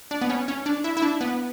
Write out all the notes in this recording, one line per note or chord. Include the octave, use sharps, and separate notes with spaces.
D4
B3
C#4
C#4
D4
E4
E4
D4
B3